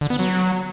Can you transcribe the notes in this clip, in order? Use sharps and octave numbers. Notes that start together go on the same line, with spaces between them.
D3
B3
F#3